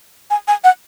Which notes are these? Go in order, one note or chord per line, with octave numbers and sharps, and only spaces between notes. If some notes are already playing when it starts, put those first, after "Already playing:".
G#5
G#5
F#5